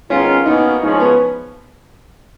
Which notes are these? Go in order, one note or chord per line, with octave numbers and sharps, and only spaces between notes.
D#3 G#3 B3 C#4 F4
B2 A#3 C#4 D#4
F3 G#3 C#4 D#4
B3